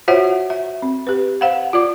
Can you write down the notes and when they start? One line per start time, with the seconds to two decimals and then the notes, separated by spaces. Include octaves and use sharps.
0.08 F4 F#4 C5 C#5 E5 F#5
0.50 E5
0.82 C4
1.07 G4 B4
1.41 C5 F5 F#5
1.73 F4 D5 D6